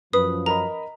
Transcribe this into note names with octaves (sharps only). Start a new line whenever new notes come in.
F#2 F3 B4 D#6
A#4 D#5 A#5 B5